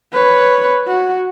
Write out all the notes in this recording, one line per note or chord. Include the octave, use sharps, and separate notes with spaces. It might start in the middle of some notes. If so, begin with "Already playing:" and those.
B4 C#5
F#4